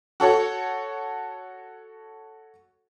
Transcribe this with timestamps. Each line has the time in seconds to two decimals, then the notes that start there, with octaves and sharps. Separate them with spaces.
0.20 F#4 A4 C#5 F#5